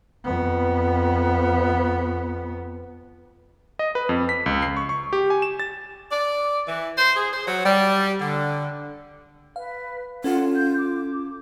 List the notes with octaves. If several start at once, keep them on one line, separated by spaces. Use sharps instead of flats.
F2 B3
D#5
B4
F2
B6
C#2
C7
C#6
C#6
G4
G#5
E7
A6
D5
E3
C5
G#4
C5
F#3
G3
D3
B4 F5
C#4 F4 A4 F#5
G6
D6